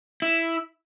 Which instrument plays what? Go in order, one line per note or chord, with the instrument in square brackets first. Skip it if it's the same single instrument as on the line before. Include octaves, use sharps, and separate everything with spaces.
[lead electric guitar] E4